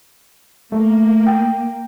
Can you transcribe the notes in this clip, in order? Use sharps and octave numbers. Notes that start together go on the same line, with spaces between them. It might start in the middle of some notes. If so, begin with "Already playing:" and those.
A3 A#3
G5